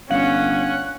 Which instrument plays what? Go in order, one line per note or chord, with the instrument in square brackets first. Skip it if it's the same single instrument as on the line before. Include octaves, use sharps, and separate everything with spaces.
[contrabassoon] G1 [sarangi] C#4 [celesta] F5 [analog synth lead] F#5